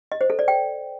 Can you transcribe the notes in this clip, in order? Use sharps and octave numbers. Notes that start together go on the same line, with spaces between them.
D#5
C5
A4
D5
G5